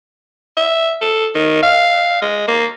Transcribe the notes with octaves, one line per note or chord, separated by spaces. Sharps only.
E5
A4
D#3
F5
G#3
A#3